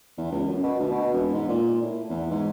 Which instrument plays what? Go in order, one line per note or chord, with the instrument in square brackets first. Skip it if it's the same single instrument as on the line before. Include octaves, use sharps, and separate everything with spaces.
[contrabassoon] E2
C#2
F#2
B2
D2
B2
E1
G#2
A#2
A2
E2
G#2